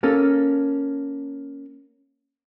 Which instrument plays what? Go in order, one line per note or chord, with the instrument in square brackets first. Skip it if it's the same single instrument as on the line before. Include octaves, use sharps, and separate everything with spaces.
[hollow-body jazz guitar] A#3 C#4 A4